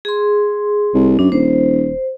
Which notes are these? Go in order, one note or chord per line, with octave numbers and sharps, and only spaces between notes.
G#4 C6
C2
F#2 D4
D#1 C5